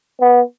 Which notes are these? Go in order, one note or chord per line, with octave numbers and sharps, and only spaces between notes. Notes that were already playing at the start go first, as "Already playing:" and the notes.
B3